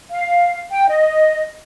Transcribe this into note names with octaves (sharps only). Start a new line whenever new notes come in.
F5
G5
D#5